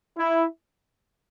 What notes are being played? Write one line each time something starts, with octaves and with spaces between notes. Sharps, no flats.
E4